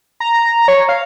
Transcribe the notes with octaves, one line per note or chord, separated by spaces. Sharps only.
A#5
C#5
F5